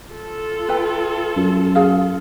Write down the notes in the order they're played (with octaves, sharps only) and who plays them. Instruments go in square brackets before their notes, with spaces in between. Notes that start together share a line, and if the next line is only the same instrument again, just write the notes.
[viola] F4 A4
[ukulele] B4 G5
[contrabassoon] F#2
[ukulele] G#4 F5